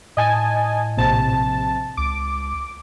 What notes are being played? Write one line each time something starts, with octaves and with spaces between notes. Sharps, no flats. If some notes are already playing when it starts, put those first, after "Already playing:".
A2 D#5 G#5 A5
A#1 C3 A5
C#2 D6